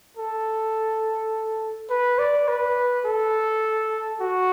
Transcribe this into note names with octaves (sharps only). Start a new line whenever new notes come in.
A4
B4
D5
B4
A4
F#4